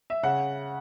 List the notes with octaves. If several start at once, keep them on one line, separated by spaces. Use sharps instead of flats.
E5
C#3 F#5